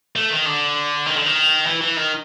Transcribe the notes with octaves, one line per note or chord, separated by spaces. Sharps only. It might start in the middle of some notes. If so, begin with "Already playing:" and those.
A3
D#3
D3
D#3
D3
D#3
E3
E3
D#3